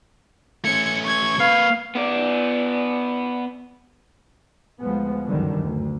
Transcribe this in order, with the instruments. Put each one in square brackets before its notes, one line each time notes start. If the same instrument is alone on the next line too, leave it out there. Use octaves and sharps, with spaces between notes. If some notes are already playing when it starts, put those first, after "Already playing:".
[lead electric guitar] A3 C#4 [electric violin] G#6 C#7
[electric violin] C#6 G#6
[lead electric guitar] A#3 B4 [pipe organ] F5
[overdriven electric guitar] B3 D5
[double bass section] D2 F3 G#3 B3
G1 C#2 F#2 D3 D#3 G3
D2